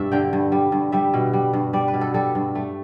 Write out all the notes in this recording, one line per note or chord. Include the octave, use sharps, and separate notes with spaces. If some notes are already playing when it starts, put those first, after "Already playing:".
Already playing: G2 B2 D5 E5
D3 G5
G2
G3
G2
G3 E5
B2
G3
G2
G3 D5
B4
B2
A4
G3 A4
G2
A3